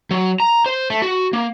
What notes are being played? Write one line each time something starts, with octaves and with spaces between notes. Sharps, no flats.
F#3
A#5
C5
A3
F#4
A#3